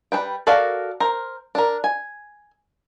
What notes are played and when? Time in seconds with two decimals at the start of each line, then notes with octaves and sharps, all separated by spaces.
0.12 G3 A4 B4 G5
0.47 F#4 A4 A#4 D5 F5
1.00 A#4 C5
1.55 D4 A#4
1.84 G#5